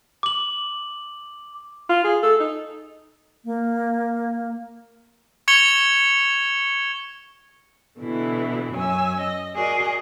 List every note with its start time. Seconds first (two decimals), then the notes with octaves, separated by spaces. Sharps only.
0.23 D6 F#7
1.89 F4
2.04 G#4
2.23 A4
2.40 D#4
3.44 A#3
5.48 C#6 G#6 C#7 F7 G7
8.00 B2 D3 E3 E4
8.74 F#2 C#4 G#5 E6
9.21 D#5
9.55 F#4 G#4 A#4 D5 D#5